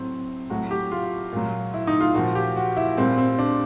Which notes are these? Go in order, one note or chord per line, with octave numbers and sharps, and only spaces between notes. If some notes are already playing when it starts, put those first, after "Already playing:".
Already playing: A2 F#3 C4
A2 F#3 F#4
G4
F4
A#2 F#3
E4
D#4
F4
A#2 F3 F#4
G4
F#4
E4
A#2 G3 C4
C4
D4